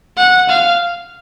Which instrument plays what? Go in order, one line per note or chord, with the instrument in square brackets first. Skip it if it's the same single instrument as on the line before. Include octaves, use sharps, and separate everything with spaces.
[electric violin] F#5
F5